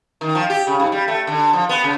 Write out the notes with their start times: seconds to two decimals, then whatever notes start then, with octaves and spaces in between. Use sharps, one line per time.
0.21 D#3
0.35 F3
0.50 G4
0.67 C#3
0.80 G#2
0.92 G3
1.08 A3
1.27 D3
1.53 F3
1.69 B3
1.84 C#3